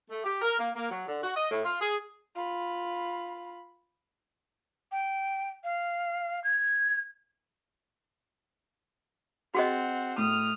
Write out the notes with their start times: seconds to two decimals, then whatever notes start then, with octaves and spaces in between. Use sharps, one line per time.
0.10 A3
0.24 G4
0.42 A#4
0.59 A#3
0.76 A#3
0.91 F#3
1.07 D3
1.24 F#4
1.36 D#5
1.51 A2
1.65 F4
1.81 G#4
2.36 F4 B5
4.92 G5
5.64 F5
6.44 G#6
9.55 C4 F#4 G#4 D#5 F#5
10.18 A2 D#6 F6